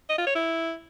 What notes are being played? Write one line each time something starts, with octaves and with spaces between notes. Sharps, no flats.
D#5
F4
C#5
E4